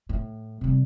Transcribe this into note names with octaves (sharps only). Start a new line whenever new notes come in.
A2
C3 G3